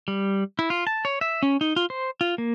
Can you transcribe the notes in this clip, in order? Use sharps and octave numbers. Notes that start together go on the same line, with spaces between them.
G3
E4
F4
A5
C#5
E5
C#4
D#4
F4
C5
F4
A#3